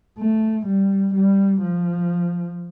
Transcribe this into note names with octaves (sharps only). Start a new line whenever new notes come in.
A3
G3
G3
F3